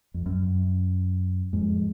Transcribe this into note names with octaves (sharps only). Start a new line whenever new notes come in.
F2
F#2
F2 G#2